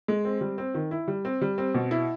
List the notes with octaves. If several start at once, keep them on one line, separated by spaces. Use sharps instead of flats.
G#3
C4
G3
C4
D#3
E4
G3
C4
G3
C4
B2
E4